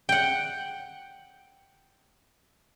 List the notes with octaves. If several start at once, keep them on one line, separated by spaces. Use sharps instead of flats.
F#5 G5